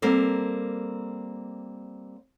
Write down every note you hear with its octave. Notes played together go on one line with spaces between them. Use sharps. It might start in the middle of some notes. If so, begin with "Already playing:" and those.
G3 A#3 C4 A4 A#4